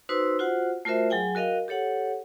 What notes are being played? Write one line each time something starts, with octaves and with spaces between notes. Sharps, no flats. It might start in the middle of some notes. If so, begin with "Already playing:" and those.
D#4 F#4 B4 C5 C6 E6
F4 F#4 C5 F#5
A3 F4 F#4 A#4 C5 E5
F#3 G#4 G5 G#5
F#4 A#4 D#5 F5 G5
G4 A4 C#5 F#5